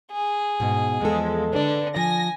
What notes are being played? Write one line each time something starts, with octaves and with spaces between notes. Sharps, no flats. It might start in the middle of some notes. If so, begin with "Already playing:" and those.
G#4
G#2 B2
E2 F3 G#3 A4
D3 D4 B4 D5
F3 G#5 A#6